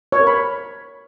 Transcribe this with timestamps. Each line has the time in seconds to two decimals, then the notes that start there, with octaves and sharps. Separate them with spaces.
0.12 C#5
0.20 A#4
0.27 B5